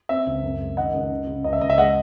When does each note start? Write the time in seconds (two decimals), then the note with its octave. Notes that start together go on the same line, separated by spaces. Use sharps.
0.09 C4 E5
0.26 C#2
0.43 F#2
0.60 G#3
0.77 D#3 D#5 F#5
0.94 C#2
1.11 C#3
1.27 C#3
1.44 C#2 D#5
1.53 E5
1.61 C#2 D#5
1.70 E5
1.78 G#3 D#5 F#5